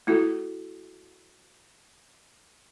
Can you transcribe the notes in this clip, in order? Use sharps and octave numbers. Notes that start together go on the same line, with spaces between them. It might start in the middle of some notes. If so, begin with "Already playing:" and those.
A3 E4 F#4 A4